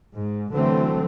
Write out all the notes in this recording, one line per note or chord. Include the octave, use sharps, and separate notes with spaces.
G#2
D3 E3 F#3 A3 C4